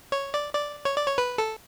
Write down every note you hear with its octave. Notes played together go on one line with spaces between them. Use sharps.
C#5
D5
D5
C#5
D5
C#5
B4
A4